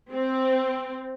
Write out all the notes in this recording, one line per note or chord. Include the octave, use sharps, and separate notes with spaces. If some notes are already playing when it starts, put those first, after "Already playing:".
C4